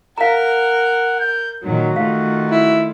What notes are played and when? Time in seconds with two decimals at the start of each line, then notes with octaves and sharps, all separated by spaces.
0.18 A#4 F5 F#5 A#5
1.20 G6
1.62 A#2 D#3 F#3 F#4
1.96 D#3 A3 F4 F5
2.51 E4